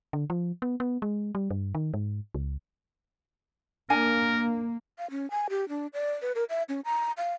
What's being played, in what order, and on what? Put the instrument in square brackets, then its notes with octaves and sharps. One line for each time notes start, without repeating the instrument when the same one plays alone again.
[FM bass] D3
F3
B3
B3
G#3
G3
G2
D#3
G#2
C#2
[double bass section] A#3 [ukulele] D4 G#5 [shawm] A#4
[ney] F5
C#4
G#5
G4
D4
D5
B4
A#4
E5
C#4
A#5
F5